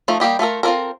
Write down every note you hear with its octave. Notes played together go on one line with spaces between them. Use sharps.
F3 A3 D#4
G3 A#3 G4 D#5
A3 F4 A4 A#4
C4 F4 F#4 A4 A#4